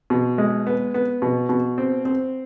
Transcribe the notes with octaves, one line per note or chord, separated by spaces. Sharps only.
B2
G#3
B3
B3
B2
B2
C4
C4